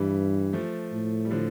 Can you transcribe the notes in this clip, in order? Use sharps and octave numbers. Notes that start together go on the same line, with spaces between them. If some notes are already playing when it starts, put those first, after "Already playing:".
Already playing: G2 E3 G3
F3 A3
A2
G3
D3 F3